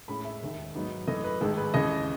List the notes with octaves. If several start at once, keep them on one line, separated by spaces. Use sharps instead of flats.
A2 G#3 C#4 E4 B5
E5
E1 D#2 D#3
G#2 F#3 B3 D#4
F#2 E3 A3 D#5
B4
A1 G#2 D#3 G#3 A4
B4
D#2 C#3 E3 D#5